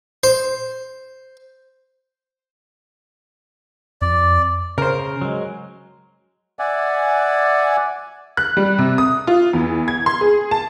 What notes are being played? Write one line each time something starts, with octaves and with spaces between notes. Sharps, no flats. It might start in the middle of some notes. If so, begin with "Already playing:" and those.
C5
F2 D5
C#3 A#4 C5
F#3 G#3
D5 E5 F#5 G#5
F#6
G3
C3
D#6
F4
E2
G#6
C6
G#4
A5